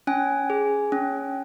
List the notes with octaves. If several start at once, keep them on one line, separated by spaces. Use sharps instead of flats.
C#4 G#5
G#4
C#4